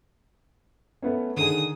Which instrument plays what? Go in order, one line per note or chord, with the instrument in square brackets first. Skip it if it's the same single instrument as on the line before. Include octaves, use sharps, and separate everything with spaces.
[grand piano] A3 B3 C#4
[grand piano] D3 D#3 G#4 [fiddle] D#6